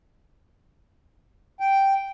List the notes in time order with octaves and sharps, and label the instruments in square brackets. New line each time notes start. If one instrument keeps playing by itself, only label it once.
[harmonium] G5